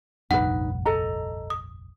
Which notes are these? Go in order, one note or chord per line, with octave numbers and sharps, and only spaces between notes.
F1 A#1 G2 D#4 B4 F#5
A4 D#5 A#5
D#6